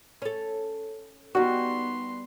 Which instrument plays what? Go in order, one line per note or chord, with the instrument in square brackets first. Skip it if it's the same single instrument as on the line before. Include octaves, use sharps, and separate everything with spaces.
[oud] C#4 A4
[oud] G3 D#4 [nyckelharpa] B3 C6 [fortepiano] F#4